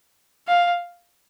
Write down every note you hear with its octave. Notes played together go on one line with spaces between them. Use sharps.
F5